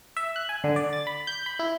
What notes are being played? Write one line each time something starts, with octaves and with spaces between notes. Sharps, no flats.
E5
F#6
G#5
D3
D5
A6
B5
G6
B5
E4